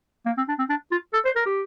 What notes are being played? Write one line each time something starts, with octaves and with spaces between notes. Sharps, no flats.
A#3
C4
D4
C4
D4
F4
A4
C5
A#4
G4